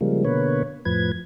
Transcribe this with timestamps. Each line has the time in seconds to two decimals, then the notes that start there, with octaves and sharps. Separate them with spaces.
0.01 C#3 F3 G3 G#3 A#3
0.25 B2 D3 A#3 B4 C#5
0.85 F2 A2 F3 B4 G#6